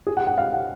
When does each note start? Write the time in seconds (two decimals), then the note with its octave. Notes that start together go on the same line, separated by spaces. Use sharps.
0.07 G#4
0.17 F#5
0.27 F#5
0.38 F5
0.53 F#5